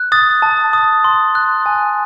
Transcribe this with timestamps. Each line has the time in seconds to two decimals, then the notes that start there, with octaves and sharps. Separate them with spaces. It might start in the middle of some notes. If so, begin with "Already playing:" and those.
Already playing: F#6
0.12 D#6 A6
0.42 A5
0.73 D#6
1.04 C6
1.35 F#6
1.66 G#5